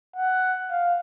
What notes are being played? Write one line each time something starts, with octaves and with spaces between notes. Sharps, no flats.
F#5
F5